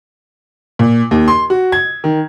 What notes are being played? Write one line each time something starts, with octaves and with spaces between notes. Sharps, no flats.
A#2
D#2
C6
F#4
G#6
D#3